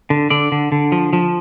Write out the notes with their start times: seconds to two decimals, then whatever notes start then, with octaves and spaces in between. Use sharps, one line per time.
0.10 D3
0.30 D3 D5
0.52 D3
0.72 D3
0.92 F3
1.13 F3